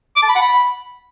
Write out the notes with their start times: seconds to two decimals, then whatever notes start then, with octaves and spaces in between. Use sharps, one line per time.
0.17 D6
0.23 A5
0.29 B5
0.35 F#5
0.42 B5